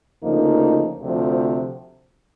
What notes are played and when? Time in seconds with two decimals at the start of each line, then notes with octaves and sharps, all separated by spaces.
0.22 D2 C#3 F3 A#3 D#4
1.01 D2 C3 F3